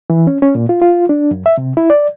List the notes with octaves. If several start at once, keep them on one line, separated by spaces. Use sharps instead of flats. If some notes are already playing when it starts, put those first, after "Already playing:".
E3
C#4
C#4
A#2
F4
F4
D4
F#2
E5
C3
E4
D5